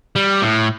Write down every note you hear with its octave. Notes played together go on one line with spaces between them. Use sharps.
G3
A2